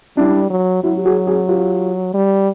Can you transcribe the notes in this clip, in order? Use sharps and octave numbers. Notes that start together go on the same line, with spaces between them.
G3 D4 E4
F#3
F#3 E4 F#4
G4
F#4 G#4
F#4 G#4
F4 G4
G3